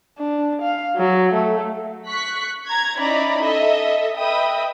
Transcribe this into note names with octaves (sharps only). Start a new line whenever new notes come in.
D4
F5
F#3
A3
C#6 F#6 B6
A#5 G#6
C#4 D#4 E4 D5 A#5 B5
A4 D#5 E5
B4 D#5 E5 G5 B5 D#6